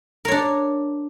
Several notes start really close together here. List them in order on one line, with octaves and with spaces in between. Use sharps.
A#4 C#5 D4